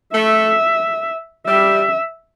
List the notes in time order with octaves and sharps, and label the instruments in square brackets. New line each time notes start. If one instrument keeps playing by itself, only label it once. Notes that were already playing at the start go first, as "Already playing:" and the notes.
[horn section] A3 [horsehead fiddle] E5
[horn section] G3 [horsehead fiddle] E5